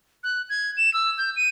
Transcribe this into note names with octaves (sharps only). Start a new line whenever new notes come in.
F#6
G#6
E7
E6
G6
D#7